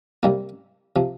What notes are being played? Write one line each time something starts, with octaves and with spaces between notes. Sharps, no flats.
C2 C3 G3 A#3 E4
C3 F3